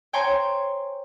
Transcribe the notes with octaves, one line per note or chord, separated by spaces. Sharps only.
C5 C#5 G5 G#5 A#5 C6